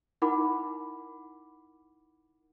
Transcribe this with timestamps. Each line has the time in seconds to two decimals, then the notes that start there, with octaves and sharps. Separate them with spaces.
0.22 D#4 E4 A#4 F#5 B5 D6